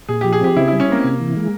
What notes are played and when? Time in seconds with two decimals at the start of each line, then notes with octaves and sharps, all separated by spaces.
0.09 A#2 G#4
0.21 F3 G4
0.32 G#4
0.41 C4 G4
0.56 C#3 E4
0.68 G3 E4
0.80 C#4
0.89 A#3 C4
1.04 C3
1.20 E3
1.36 G#3